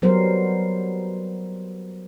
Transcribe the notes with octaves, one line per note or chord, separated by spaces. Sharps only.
F#3 G3 B3 A#4 C5